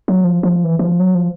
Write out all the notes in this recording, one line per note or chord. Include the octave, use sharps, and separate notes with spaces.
F#3
F3
F3
E3
E3
F3
F#3
F3